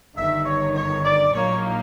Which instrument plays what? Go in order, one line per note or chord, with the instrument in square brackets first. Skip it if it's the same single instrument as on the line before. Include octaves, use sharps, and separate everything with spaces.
[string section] G1 G2 D#3 [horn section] E5
[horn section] C#5
C#5
D5
[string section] A#1 A#2 F#3 A#3 D#4 [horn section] C#5